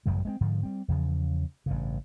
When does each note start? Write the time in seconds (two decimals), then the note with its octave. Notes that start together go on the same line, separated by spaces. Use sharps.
0.06 A1 F#2 C#3 G3
0.25 G#3 A#3 C4
0.41 G#2 D3 F3
0.63 G3 C4
0.88 E2 C#3 F3
1.66 A1 G2 C#3